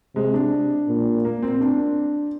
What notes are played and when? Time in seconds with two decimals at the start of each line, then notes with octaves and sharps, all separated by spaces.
0.16 C3 G#3
0.34 D4
0.88 A#2
1.25 A#3
1.43 C4
1.61 D4